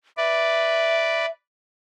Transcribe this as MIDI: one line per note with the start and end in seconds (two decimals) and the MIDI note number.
0.17 1.26 71
0.17 1.26 74
0.17 1.30 76